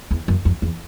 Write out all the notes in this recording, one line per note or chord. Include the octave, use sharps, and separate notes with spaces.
E2
F#2
F2
E2